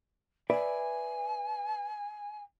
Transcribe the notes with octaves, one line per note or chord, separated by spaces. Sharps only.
B4 D5 E5 G#5